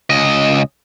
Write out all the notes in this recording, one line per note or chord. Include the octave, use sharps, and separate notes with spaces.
C#2 D#5